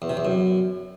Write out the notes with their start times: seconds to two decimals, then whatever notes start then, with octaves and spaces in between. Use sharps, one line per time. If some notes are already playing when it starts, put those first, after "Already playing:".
0.02 E2
0.09 C3
0.17 E2
0.25 F#2